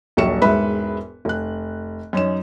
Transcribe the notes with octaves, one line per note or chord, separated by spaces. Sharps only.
D#1 A#1 F#3 C#6 C#7 E7
E1 G#2 B4 E5 B5
F1 F#6
F#2 C#4 D#4 E7